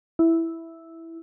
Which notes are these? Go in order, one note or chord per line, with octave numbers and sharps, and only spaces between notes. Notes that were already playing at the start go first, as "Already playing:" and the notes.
E4